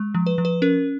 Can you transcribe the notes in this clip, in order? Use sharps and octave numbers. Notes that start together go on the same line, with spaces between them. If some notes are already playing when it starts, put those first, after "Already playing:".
Already playing: G#3
F3
B4
F3
B4
C#4 A#4